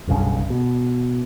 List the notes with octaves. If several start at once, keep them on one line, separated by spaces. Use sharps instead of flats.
F#1 B1 G2 C#3
B2